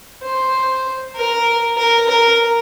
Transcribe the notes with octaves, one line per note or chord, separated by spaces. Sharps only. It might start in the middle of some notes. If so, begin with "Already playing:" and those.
C5
A#4
A#4
A#4